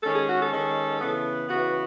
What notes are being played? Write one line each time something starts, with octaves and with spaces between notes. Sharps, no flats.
D#3 G#3 C#4 A4
G#4
F#4
A4
D#3 G#3 C#4
C#3 E3 B3
C#3 E3 B3 F#4